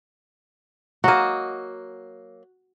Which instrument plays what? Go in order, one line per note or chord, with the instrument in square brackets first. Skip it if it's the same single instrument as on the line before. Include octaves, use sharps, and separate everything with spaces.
[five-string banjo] F#3 A#3 [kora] F#4 D#5